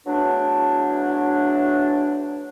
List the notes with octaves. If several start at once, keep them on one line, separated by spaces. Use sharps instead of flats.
E2 F#3 A3 D4